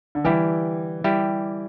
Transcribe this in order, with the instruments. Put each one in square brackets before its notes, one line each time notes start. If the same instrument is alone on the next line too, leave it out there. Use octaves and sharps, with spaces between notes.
[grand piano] D3
[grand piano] E3 [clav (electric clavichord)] G3 E4 G4
[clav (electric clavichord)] G3 E4 G4